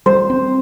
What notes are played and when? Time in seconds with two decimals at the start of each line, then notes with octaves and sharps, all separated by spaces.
0.06 G3 C5
0.30 C4